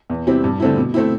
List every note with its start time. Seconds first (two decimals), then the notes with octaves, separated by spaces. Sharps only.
0.10 E2
0.27 C3 G3 C4 E4
0.44 G2
0.60 D3 A3 C4 E4
0.77 B2
0.94 A3 C4 E4